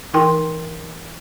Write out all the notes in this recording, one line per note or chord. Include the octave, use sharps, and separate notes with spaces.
E3 D#4 A#4 G5 C6